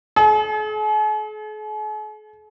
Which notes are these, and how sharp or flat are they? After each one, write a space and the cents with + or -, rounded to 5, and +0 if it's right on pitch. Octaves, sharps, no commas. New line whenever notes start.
G#4 +45